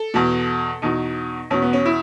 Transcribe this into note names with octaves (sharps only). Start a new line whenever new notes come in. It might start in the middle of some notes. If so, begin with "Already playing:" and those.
Already playing: A4
E2 B2
E2 B2 D#4
E2 B2 C#4
B3
C#4
E4